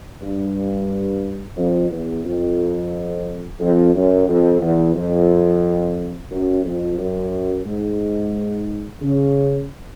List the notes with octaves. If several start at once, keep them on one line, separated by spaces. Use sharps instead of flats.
G2
F2
E2
F2
F2
F#2
F2
E2
F2
F#2
F2
F#2
G#2
C#3